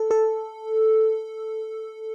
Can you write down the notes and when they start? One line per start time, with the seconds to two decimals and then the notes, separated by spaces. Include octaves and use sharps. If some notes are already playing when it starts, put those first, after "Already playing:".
Already playing: A4
0.11 A4